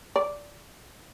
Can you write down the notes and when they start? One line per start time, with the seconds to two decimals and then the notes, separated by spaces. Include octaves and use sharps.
0.16 D5